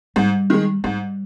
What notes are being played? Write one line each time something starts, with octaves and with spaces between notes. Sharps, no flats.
G#2 G3
D#3 G#3
G#2 G3